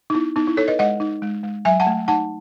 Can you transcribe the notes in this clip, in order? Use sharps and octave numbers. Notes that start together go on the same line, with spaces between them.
D#4
B3 E4
B3 D#4
E4
D#4 A4 C#5
B4 D#5
G#3 D#5 F#5
D#4
G#3
G#3
F#3 E5 G#5
F#5 A5
A3
D#4 F#5 A5